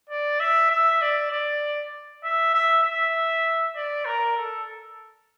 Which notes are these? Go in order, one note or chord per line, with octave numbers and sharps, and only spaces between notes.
D5
E5
E5
D5
D5
E5
E5
E5
D5
A#4
A4